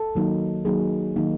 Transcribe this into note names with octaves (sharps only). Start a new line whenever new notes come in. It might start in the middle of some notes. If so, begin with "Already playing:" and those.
Already playing: A4
D#3 F#3 A#3 D#4
D#3 F#3 A#3 D#4 G#4
D#3 F#3 A#3 D#4